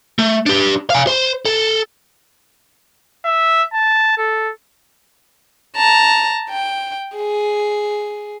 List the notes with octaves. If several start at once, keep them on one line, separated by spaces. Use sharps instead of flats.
A3
D4 G4
F5 G#5
C5
A4
E5
A5
A4
A5 A#5
G5
G#4